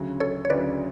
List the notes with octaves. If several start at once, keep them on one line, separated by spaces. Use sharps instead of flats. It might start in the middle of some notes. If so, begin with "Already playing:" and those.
Already playing: D2 C#3 F#3
A4 C#5
C#5
D2 C#3 F#3 B4 D5